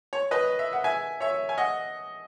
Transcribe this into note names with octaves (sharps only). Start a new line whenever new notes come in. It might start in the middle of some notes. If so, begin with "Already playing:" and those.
C#5
B4 D#5
E5
F#5
E5 G#5
C#5 E5
G#5
D#5 F#5